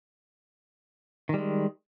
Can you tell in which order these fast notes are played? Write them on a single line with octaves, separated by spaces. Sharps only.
D#3 G3 G#3